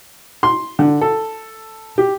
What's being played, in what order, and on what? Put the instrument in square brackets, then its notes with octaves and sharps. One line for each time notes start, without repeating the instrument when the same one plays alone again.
[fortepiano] C6
D3
A4
G4